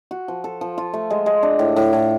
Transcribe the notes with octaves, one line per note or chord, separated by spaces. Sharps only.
F#4
F3
A4
F3
F4
A3
G#3
G#3
D4
A2
A2
A2